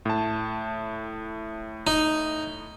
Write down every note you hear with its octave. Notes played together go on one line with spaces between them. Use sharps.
A2 A5
D#4